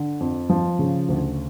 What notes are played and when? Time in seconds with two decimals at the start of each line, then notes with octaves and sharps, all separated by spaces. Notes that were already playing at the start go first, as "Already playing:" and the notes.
Already playing: D3
0.20 F2
0.50 F3
0.79 C#3
1.08 D2